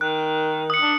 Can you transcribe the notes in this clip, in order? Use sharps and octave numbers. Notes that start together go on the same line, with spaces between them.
D#3 F#6
D#6 C#7
D4